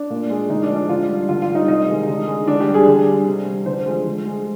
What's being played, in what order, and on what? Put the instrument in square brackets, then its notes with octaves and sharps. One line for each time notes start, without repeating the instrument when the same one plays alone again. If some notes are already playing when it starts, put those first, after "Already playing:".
Already playing: [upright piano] D4
A#2
G#3
D3 D#4
D4
F3 G#3
D4
D3 F4
G3
D3 F4
F4
G3
D#4
C3 D#4
D#3 G#3
D3
G#3
D3 D4
G4
G3
G#4
D3
G3
C3
G3
D3 C5
F3 G#3
D3
G#3